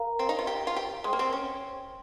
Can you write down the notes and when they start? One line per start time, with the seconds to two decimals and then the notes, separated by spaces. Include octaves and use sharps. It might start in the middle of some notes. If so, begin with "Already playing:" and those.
Already playing: A#4 F5 A#5
0.19 C4
0.29 D#4
0.39 F4
0.47 G4
0.67 F4
0.76 G4
1.04 G#3 C5 G5 C6
1.13 A#3
1.19 C4
1.33 C#4